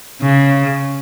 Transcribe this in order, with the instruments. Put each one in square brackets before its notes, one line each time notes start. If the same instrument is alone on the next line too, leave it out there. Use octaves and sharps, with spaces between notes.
[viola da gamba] C#3